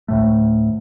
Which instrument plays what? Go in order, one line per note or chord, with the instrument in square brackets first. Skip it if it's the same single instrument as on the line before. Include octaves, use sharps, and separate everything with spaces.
[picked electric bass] D2 A2 A3